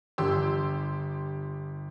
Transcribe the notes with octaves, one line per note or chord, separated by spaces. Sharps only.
G1 G4 C6 E6